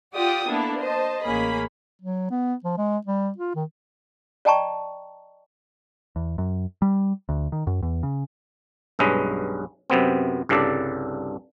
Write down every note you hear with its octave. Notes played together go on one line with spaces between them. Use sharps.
F4 G4 D5 F#5 G5 D#6
A#3 B3 D4 E4 A4
C5 D#5 A5
A1 A#3 C#4 G#4 B5
F#3
B3
F3
G#3
G3
F4
D#3
D5 D#5 G5 A5 A#5 C#6
E2
F#2
G3
D2
D#3
F#2
E2
C#3
B1 G2 G#3 C#4 B4 D#5
F#2 C3 B3 C4
C2 G2 C#3 D4 A4 D5